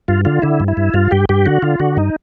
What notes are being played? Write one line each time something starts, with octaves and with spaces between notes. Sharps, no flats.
G2 F4
D3 F4
D3 E4
G2
E4
G2
G2 F4
G2 G4
G2 G4
D3 F#4
D3 F4
D3 F#4
G2 D#4